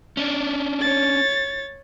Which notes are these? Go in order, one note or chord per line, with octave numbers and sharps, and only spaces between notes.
C#4 D4
C#5 A6